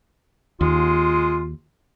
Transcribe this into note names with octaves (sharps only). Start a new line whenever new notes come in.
D#2 G#3 F4